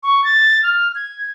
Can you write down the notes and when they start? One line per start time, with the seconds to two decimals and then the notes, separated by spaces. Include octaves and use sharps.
0.03 C#6
0.24 A6
0.63 F6
0.95 G#6